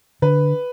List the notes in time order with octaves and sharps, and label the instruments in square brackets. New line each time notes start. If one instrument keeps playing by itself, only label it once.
[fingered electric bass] D3 [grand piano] B4